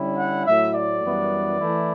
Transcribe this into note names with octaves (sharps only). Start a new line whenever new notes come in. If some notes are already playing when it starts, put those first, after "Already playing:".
Already playing: D3 G3 C#4 E4
F#5
A2 F#3 A3 E4 E5
D5
F#2 E3 G3 B3
E3 A3 E4